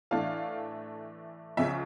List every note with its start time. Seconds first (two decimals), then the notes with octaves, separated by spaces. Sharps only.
0.11 A2 E3 A3 D4 F5
1.57 C#2 C#3 F3 E5